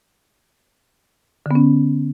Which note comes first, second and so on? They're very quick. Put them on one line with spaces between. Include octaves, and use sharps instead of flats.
D3 B3 C#4